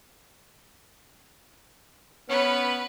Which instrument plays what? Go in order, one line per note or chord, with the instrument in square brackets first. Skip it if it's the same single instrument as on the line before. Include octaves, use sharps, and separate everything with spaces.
[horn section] B3 C#4 [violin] B4 B5